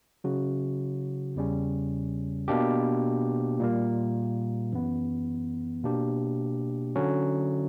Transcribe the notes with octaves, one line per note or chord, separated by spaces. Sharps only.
C#3 F#3 C#4 F#4
E2 C#3 G3 C#4
B2 A#3 D4 G4
A#2 G3 A#3
F#2 E3 B3
B2 A#3 D4 G4
D3 F#3 C#4 F#4